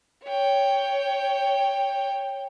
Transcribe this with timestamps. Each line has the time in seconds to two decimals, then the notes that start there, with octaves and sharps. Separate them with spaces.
0.24 C#5 G5